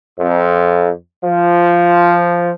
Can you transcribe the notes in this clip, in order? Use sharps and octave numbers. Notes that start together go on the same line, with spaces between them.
F2
F3